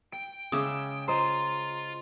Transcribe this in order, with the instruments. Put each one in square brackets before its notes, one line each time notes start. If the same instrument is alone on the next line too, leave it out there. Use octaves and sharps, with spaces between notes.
[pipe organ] G5 [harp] D7
[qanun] C#3 G#3 E5 [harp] D6 [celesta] D#6
[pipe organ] F4 [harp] C5 D#5 [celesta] A#5